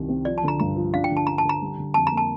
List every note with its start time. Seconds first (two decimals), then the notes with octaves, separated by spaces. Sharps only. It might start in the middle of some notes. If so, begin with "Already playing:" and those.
Already playing: C2 D#3 G3
0.08 C3
0.25 F3 D5
0.38 A5
0.43 D3 A#5
0.60 G2 A#5
0.76 F3
0.93 D4 F5
1.04 G5
1.10 D3
1.17 A5
1.27 D4 A#5
1.38 A5
1.44 D3
1.49 A#5
1.62 G3
1.78 D3
1.94 F2 A5
2.07 A#5
2.12 A#3
2.17 A5